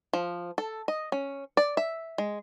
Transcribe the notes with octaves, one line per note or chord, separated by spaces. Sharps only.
F3
A4
D#5
C#4
D5
E5
G#3